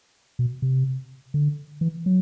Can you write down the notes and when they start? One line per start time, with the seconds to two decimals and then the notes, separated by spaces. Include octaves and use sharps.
0.39 B2
0.62 C3
1.34 D3
1.81 E3
2.06 F#3